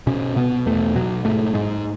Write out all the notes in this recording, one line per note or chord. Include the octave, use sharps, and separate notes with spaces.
B2 C#4
B2 B3
E2 A3
B2 F#3
G#2 A3
G#2 G#3